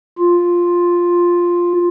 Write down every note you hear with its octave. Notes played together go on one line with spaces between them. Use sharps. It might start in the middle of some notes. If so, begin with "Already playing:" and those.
F4